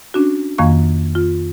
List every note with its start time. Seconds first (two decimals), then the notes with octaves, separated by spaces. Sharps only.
0.14 C#4 D4 F#4
0.58 F2 D#3 A#3 F5 A#5 C#6
1.15 F4